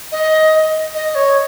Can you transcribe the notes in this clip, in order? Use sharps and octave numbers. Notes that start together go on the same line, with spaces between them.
D#5
D#5
C#5